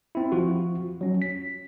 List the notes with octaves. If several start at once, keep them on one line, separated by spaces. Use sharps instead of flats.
C4 E4
F3 F4 F#4
F#3 C#4
B6